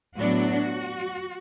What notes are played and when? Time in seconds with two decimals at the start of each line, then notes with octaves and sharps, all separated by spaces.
0.17 A2 F#3 B3 D4 F#4